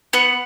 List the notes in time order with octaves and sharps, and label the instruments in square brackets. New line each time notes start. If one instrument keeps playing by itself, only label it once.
[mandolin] B3 F#5